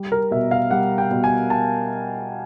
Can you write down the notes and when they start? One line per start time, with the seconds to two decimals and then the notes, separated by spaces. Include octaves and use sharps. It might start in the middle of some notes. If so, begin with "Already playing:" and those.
Already playing: G3
0.12 A#4
0.31 B2 E5
0.51 F5
0.71 G3 F#5
0.98 G5
1.11 B2
1.24 G#5
1.50 A5